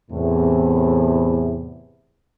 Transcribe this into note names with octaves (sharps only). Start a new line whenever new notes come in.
E2 A2 C3